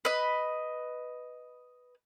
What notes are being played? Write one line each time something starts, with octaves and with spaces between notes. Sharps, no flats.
B4 D#5